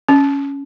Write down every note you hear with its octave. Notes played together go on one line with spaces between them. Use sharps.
C#4